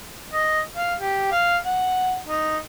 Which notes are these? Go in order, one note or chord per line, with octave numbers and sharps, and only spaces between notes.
D#5
F5
G4
F5
F#5
D#4